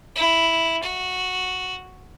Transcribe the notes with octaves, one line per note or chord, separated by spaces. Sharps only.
E4
F#4